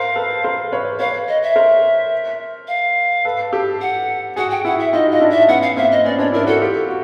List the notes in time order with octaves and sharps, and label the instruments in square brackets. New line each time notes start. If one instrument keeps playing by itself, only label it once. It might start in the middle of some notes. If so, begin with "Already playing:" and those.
Already playing: [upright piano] A#4 C5 [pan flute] F5
[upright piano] A4 B4
A#4 C5
B4 C#5
[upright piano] B4 C#5 [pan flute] F5
[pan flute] D#5
E5
[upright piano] A#4 C5
[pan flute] F5
[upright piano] A4 B4
G4 A4
[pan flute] F#5
[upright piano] F#4 G#4 [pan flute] F#5
[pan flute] G5
[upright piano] E4 F#4 [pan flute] F#5
[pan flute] E5
[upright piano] D#4 F4 [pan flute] D#5
[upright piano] F#4
[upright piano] F4 [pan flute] D#5
[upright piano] D4 E4
[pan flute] E5
[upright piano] B3 C#4 [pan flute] F#5
[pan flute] F5
[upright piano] A#3 C4 [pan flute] E5
[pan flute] D#5
[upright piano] B3 C#4 [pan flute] D5
[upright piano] C4 D4 [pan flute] C#5
[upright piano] D4 E4 [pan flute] A#4
[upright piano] E4 F#4 [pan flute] A4
[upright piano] F4 G4
F#4